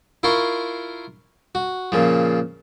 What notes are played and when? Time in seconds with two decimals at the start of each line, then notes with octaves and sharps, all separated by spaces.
0.23 E4 F4 A#4 C6 C#6
1.55 F#4
1.92 A#2 C#3 F3